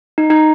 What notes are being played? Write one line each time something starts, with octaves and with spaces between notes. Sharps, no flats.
D#4
D#4